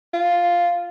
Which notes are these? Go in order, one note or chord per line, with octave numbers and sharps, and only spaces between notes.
F4